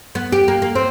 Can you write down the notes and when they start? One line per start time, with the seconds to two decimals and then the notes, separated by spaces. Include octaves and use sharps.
0.15 B3
0.32 G4
0.48 A#3
0.62 A#3
0.75 C4